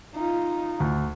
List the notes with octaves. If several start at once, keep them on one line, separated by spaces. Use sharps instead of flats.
D#4 F4
D2